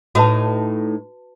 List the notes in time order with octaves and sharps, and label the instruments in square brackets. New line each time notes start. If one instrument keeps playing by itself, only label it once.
[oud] A2 D#4 D#5 [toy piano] F#4 B4 A5